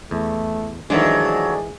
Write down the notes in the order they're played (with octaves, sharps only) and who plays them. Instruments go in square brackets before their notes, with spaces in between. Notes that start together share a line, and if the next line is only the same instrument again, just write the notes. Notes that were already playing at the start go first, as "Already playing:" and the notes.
[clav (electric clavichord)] E2 [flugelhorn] A3
[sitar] F2 F#3 [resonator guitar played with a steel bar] D#3 A3 D4 [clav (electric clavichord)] E3 G#3 [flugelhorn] G#4